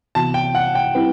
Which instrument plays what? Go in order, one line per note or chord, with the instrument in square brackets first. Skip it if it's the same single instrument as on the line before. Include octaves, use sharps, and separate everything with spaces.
[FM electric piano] C3 E3 B3 F#4 [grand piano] A5
[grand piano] G5
F#5
G5
[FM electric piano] G3 C4 E4 G4 B4